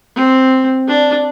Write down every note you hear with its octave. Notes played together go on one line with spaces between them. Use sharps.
C4
D4